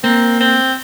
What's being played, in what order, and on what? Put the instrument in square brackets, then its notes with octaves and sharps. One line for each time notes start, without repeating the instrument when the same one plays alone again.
[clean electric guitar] A#3 [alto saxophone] C4
[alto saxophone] C4